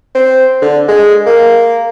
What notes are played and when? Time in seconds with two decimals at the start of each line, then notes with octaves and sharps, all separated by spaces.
0.15 C4
0.62 D3
0.88 G#3
1.26 A#3